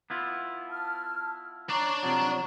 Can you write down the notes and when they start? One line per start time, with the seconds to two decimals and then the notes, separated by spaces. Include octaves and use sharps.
0.10 B3 E4 F4
0.69 A5 F6
1.69 D4 C#5 D5 A#5 C#6
2.03 C3 F3 F#3